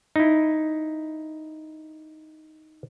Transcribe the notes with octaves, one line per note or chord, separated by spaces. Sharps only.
D#4 E4